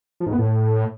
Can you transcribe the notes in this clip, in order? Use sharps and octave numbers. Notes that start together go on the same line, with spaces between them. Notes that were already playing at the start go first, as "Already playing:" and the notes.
F3
G#2
B3
A2